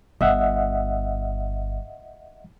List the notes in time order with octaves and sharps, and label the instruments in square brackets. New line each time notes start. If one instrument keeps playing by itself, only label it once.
[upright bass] G1 [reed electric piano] D#5 E5 F#5